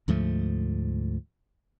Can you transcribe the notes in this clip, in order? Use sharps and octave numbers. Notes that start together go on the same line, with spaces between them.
D2 G#2 F3 A3